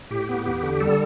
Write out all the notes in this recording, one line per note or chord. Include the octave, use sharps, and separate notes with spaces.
A2 G4
B3
E2 G4
D3
G3 A4